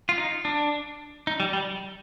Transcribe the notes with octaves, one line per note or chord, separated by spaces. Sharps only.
F4
D#4
D4
D#4
G3
G3